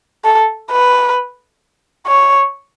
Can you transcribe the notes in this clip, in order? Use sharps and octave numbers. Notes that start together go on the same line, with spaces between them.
A4
B4
C#5